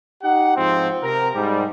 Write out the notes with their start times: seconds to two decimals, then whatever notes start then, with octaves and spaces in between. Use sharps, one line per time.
0.23 D#4 G4 F#5
0.56 G#2 F3 C4
1.03 C3 A#4
1.35 G#2 G3